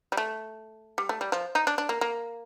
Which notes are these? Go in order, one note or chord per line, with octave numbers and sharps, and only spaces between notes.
G3
A3
G3
A3
G3
F3
D#4
D4
D4
A#3
A#3